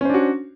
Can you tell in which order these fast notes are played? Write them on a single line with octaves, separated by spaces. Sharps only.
C#4 C5 D4 F#4